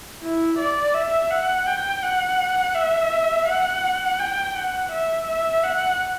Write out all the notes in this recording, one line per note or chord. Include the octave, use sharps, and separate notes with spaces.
E4
D5
E5
F#5
G5
F#5
E5
F#5
G5
F#5
E5
E5
F#5